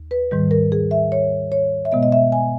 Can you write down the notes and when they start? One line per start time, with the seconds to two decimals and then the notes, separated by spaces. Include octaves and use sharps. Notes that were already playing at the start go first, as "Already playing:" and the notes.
Already playing: D#2
0.11 B4
0.31 G#2 D#3 G3
0.51 A#4
0.72 G#4
0.91 E5
1.12 C#5
1.52 C#5
1.85 E5
1.92 B2 G#3 B3 D#5
2.03 D#5
2.12 E5
2.32 G#5